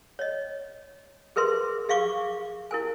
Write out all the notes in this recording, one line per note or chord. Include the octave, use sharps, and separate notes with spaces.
C#5 D#5
G#4 A#4 B4 E5 C6
G#4 E5 F5 C#6 D6
E4 A#4 G#5